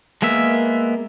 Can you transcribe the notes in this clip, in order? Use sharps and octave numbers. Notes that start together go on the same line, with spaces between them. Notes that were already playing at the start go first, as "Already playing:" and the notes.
G#3 A#3 B3 E5